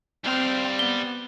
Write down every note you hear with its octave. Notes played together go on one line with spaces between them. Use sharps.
G3 C4 F5
B3 G7